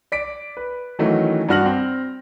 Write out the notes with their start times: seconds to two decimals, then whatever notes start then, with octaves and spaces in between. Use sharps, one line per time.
0.12 D5 B6 D7
0.57 B4
0.99 D#3 E3 F#3 A3 C#4 D#4
1.49 G2 D4 F#4 F6 A#6 F#7
1.66 C4